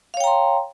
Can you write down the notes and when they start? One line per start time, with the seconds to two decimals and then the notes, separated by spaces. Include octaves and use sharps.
0.14 F5
0.17 C#5
0.20 G5
0.24 A#5
0.27 C6